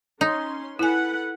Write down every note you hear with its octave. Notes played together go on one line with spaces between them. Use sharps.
C#4 D#4 C6
E4 A4 B4 F#5 G#5